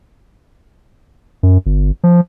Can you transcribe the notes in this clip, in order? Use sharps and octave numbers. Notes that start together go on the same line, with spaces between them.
F#2
G1
F3